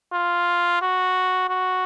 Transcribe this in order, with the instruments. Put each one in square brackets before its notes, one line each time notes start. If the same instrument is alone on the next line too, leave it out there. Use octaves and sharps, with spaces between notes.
[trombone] F4
F#4
F#4